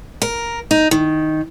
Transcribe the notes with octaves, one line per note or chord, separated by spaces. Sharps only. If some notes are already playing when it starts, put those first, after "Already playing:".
A#4
D#4
D#3